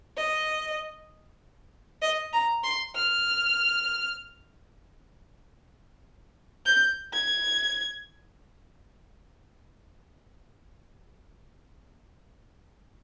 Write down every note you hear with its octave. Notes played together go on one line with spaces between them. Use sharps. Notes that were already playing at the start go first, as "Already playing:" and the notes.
D#5
D#5
A#5
C6
F6
G6
G#6